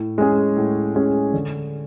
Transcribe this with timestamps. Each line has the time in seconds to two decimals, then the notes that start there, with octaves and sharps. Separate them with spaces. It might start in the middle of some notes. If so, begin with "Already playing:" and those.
Already playing: A2
0.18 G#3 C#4 G#4
0.57 A2
0.95 G#3 C#4 G#4
1.33 D3